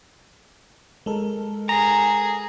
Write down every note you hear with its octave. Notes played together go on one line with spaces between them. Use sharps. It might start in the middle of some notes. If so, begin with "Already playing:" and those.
G#3 A4 A#4
G#4 A#5